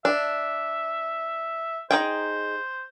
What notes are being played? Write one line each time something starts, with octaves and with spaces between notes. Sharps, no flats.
D4 E5
D#4 G#4 C5 G5